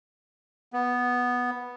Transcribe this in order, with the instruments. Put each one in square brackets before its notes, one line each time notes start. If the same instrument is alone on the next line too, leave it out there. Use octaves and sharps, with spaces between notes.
[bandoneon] B3